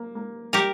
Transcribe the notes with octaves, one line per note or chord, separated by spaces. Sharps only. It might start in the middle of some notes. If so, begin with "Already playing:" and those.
Already playing: A#3
A#3
G3 G4 A#4